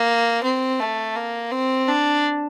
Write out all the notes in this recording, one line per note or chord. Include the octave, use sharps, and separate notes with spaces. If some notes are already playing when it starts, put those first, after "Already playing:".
Already playing: A#3
C4
A3
A#3
C4
D4